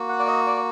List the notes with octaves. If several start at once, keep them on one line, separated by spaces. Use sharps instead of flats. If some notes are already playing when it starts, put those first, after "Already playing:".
Already playing: A#3 F#4
F#5
D5
D#5
D5